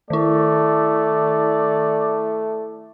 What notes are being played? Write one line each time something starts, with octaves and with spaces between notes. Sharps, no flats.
D#3 A3 E4 D5